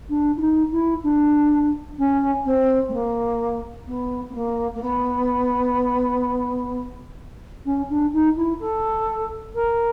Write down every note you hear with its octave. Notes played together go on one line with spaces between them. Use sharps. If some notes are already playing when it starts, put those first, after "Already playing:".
D4
E4
D#4
E4
D4
C#4
C4
A3
A#3
B3
B3
A#3
A#3
B3
C#4
D4
D#4
E4
A4
A#4